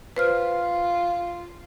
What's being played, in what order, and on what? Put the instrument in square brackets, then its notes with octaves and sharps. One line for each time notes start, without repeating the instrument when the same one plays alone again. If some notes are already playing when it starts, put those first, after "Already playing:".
[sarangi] F4 [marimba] B4 C5 F6